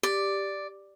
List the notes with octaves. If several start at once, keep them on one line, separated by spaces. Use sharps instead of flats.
G4 D5